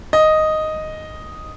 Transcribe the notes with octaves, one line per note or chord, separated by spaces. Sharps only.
D#5